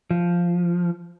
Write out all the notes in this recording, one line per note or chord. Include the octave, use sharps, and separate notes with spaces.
F3